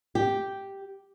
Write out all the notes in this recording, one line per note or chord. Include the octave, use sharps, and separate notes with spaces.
G4